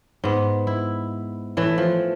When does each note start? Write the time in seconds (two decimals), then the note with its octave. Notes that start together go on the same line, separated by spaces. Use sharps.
0.24 G#2 B3
0.67 E4
1.57 A2 E3 A3
1.78 F3